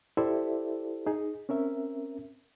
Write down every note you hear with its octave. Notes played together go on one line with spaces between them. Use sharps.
E4 G4 A4 C5 D5 E5
D#4 G#4
C4 C#4 A#4 E5